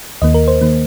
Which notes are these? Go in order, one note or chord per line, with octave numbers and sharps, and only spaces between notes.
D#2 D#3 A#3 D#5
A#4
C5
D#3 A#3